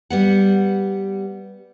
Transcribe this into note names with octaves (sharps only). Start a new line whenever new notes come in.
G3 B3 F#5